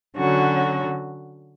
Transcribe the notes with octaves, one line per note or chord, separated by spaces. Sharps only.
D3 F#3 C#4 F#4